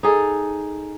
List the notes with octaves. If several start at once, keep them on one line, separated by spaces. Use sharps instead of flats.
D#4 G#4 A4